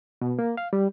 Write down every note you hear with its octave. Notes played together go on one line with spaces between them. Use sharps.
B2
A#3
F5
G3